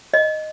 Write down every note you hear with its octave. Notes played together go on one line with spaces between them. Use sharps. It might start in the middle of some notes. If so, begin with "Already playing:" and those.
D#5